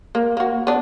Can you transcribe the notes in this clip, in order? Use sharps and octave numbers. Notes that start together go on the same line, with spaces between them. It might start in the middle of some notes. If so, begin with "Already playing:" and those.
A#3
A#3 F#4
B3 D4